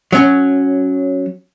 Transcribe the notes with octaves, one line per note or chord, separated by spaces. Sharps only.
F#3 C#4